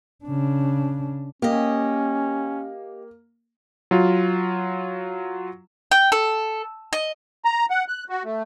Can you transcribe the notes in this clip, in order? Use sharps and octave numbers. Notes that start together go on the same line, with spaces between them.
C#3 D4
A#3 C#4 G4 D#5
F#3 F4
G5
A4
D#5
A#5
F#5
F#6
F#4
A3